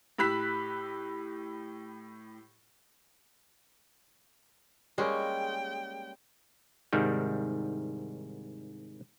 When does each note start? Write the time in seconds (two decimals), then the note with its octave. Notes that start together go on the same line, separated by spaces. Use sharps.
0.18 A2 G4 B5 E6 F#6 B6
4.98 G3 G#3 A#3 C#4 G5
6.93 C2 G#2 D#3 G3